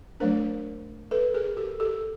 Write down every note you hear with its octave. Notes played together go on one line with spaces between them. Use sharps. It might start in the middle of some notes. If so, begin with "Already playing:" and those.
F#3 A3 D4 A#4 C5
A4 B4
G#4 A#4
G4 A4
G4 A4